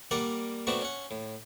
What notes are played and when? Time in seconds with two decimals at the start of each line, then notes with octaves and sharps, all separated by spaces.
0.11 G3 A#3 A#4 D5 F#5
0.67 A3 B3 C4 D4 F#4
0.81 C#4 F#5
1.11 A2